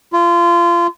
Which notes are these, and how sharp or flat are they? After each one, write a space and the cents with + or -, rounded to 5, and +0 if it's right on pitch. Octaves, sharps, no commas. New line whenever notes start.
F4 -25